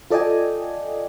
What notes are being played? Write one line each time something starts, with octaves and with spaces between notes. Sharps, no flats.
F4 A4 D5 D#5 G5 G#5